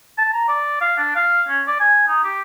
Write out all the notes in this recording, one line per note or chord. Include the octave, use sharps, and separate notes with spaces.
A5
A#5
D5
F5
D4
F5
C#4
D5
G#5
D#4
G4